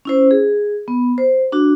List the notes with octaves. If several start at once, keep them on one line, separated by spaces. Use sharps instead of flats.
C#4 E4 C5
G#4
B3
C5
D4 F#4